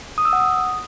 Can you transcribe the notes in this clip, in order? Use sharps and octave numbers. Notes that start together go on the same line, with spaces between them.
D#6
E6
F#5
D#6